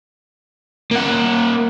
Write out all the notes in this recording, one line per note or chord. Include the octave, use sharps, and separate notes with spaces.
A#3 F#5